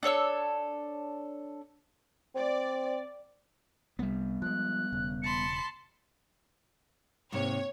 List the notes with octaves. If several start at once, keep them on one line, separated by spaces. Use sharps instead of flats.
D4 A4 C#5 E6
C4 D5
C2 G3 B3
F3 G#3 F#6
E1 C#3
A5 B5 C6 C#7
G#2 C3 A#3 C#5